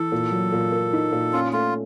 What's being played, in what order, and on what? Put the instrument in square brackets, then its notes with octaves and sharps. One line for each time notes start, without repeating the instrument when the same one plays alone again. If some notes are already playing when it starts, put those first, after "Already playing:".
Already playing: [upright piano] E3 [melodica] A4
[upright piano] A#2
F#3
A#2
A#3
D#4
A#2
[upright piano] C#4 [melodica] F4
[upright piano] A3 [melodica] F4